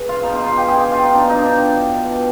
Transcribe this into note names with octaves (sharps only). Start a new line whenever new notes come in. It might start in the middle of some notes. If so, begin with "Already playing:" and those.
Already playing: G#4 B4
F4
B2 D#4
F4
F4
G4
G#4
G4
F4
D#4
B2 D4
D#4
D4
B2